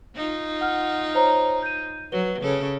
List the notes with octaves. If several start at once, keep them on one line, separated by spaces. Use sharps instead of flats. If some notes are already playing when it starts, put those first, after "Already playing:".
D#4 F4
F#5 F6
C5 C#5 A#5
G6 D#7
F#3 B4 G7
C#3 C#4 A4